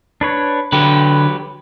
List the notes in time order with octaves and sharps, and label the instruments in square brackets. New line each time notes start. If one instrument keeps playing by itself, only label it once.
[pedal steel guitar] D4 B4 C#5
[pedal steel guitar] D3 [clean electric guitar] F#3 G4 B4